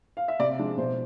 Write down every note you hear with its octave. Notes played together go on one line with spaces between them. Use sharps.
F5
E5
C3 D5
F3 G#3 D4
B2 C5